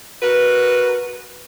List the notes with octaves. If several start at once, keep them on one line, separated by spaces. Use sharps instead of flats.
F#4 A#4 B4